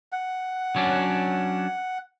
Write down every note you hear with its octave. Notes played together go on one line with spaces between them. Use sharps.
F#5
F#3 C#4 D4